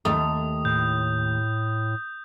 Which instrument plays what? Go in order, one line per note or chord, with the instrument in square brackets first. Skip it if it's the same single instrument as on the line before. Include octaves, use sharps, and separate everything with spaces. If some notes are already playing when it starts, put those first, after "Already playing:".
[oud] D#2 A3 [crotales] D#6
[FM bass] A2 [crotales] G6